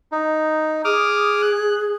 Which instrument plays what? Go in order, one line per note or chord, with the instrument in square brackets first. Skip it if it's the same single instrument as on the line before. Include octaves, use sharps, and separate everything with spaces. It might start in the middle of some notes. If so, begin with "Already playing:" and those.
[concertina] D#4
[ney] G#4 [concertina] D6 D#6 F6
[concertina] F#6